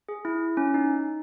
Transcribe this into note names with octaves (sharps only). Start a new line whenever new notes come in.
G#4
E4
C#4
D#4